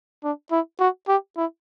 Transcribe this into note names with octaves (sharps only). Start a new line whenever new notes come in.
D4
E4
F#4
G4
E4